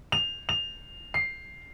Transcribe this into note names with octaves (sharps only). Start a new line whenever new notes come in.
F7
F7
C7